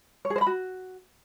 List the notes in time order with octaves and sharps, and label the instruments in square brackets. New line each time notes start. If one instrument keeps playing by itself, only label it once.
[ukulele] C#5
G#4
C5
B5
F#4